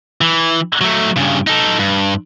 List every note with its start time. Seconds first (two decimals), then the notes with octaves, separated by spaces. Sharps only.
0.21 E3
0.81 F#3 A3
1.16 G2 C#3
1.47 D#4 A4
1.80 G2